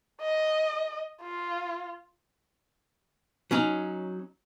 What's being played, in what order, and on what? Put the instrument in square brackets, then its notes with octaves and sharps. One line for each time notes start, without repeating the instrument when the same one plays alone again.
[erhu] D#5
F4
[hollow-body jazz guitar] F#3 C#4 D#4